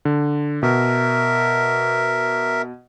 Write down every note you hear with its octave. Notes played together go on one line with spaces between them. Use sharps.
D3
B2 A#4 E5